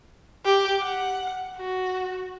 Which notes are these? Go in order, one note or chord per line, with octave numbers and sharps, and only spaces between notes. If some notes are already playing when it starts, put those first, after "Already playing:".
G4
F#5
F#4